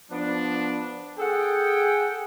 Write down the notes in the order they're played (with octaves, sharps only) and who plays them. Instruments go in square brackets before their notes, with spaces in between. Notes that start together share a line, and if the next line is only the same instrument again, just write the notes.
[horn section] F3 B3 D4
G#4 A4 F#5 G5